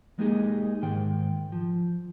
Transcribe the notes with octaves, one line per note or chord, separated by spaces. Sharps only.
G#3 A#3 D#4 G4 G#4
G#2 D#3 G5
F3